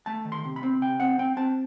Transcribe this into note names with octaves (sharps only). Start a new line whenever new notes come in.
A3 A5
D#3
C6
C3
B5
C4
C3 G5
C4 F#5
C4 G5
C4 A5